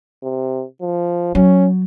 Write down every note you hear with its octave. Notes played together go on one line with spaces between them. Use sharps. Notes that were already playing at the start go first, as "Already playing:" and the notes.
C3
F3
F#3 C#4